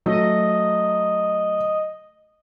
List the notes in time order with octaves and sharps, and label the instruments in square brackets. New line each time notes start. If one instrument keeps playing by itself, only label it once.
[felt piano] F#3 A3 [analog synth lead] D#5